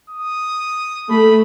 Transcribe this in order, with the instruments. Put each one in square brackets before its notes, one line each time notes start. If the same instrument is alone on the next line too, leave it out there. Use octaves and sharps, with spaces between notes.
[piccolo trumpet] D#6
[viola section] A3 [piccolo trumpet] B5